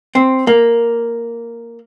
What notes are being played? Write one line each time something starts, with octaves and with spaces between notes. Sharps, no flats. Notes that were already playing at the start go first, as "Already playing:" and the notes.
C4
A#3